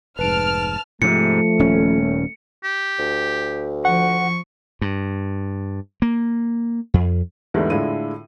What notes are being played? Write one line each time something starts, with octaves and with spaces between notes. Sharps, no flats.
F1 G#2 B4 A5 F6 D7
G#2 C3 F3 A3 C#7
D#1 C#4
G4
D2
F3 F#5 C#6
G2
A#3
F2
E2 G#2 D3 E3 G3 A3
A2 D3 G#3 E4 F4 D#7